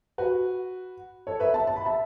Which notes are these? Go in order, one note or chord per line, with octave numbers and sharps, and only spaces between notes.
F#4 B4
A4 C#5
B4 E5
E5 A5
A5
B5
E5 A5